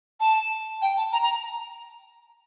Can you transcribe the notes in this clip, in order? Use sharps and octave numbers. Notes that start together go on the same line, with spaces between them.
A5
G5
A5
A#5
A#5